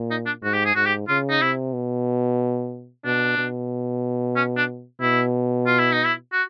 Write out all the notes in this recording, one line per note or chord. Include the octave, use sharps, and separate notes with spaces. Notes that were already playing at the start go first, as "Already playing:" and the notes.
Already playing: A#2
D#4
D4
G#2 F#4
G4
G#4
G#2 F#4
G4
C#3 F4
D#4
C3 E4
B2
B2 D4
B2
C#4
D4
B2 E4
F4
E4
D#4
E4
F#4